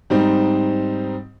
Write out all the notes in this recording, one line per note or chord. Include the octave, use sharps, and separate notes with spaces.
G#2 G3 C4 D#4